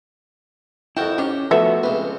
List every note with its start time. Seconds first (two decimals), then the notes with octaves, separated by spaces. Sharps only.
0.97 F2 E4 F#4 A#4 G5 A5
1.18 D#3 C#4 G4
1.51 F3 A3 B3 F#4 E5
1.83 C#2 C4 B4